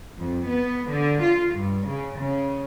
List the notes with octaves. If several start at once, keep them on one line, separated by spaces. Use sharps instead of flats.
F2
B3
D3
F4
G2
C#3
C#3